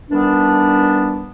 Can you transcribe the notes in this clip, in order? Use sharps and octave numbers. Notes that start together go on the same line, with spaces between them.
D#3 E3 G3 B3 D4